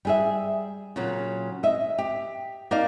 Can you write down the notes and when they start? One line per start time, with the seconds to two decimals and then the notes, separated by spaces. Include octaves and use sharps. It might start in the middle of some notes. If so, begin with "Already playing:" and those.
0.05 G3 G#4 E5
0.96 A#2 C#3 F#3
1.63 D#5 E5
1.98 G4
2.71 A#3 D4 D#4 D5 F5